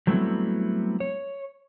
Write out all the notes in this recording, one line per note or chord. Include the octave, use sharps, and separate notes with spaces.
F#3 G3 A3 B3 C4 E4
C#5